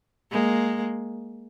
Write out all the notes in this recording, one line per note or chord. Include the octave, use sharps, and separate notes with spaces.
G#3 A#3